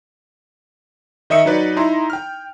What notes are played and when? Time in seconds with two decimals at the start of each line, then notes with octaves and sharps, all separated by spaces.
1.30 D#3 D#5 E5 D#6 C#7
1.45 F#3 D#4 B4 D5
1.76 D#4 E4 A#5 C6
2.10 G5 F6